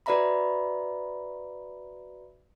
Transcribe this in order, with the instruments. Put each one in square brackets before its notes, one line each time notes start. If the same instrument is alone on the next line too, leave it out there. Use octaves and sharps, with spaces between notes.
[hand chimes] F#4 B4 D5 E5 A#5 B5